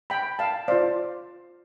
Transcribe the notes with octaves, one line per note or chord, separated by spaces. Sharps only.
G5 B5
F5 A5
F4 C5 D5 F5